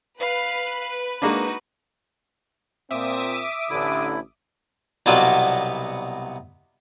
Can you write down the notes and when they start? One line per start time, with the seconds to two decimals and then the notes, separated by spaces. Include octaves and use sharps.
0.20 B4 F5
1.22 G#3 A#3 D4 D#4 F#4
2.91 A#2 C4 E5 D6 D#6
3.70 A1 D3 E4
5.06 C2 B2 F#3 B3 F4 D5